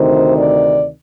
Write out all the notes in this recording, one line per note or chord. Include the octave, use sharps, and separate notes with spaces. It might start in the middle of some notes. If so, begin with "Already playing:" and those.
Already playing: D2 C3 D#3 C5
D5